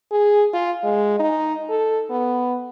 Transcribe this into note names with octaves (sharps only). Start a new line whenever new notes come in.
G#4
F4
G#3
D#4
A4
B3